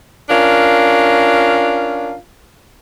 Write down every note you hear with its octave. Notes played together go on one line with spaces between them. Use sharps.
C#4 D4 F4 A#4